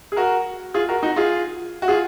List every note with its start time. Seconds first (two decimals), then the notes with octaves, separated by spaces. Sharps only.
0.12 G#4
0.16 F#4 A#4
0.74 F4 G#4
0.89 F#4 A#4
1.03 D#4 F#4
1.16 F4 G#4
1.82 F#4
1.88 F4 G#4